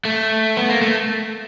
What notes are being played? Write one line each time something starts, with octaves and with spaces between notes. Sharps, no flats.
A3
B3
A#3
A3